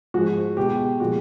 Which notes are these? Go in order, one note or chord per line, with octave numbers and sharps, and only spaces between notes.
G#2 F3 G#3 F#4
B2 G#3 G4
A#2 F3 G#3 F#4